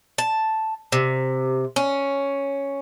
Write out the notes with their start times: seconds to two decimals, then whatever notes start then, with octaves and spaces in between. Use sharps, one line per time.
0.18 A5
0.92 C3
1.76 C#4